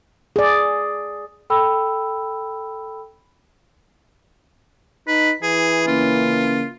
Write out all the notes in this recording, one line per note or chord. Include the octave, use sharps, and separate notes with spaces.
G#4 D5
A4 G5 B5 E6
D#4 B4
E3 G#4
C#3 A#3 C#4 F4